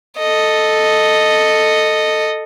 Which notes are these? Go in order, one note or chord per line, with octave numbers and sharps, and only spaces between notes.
A4 D#5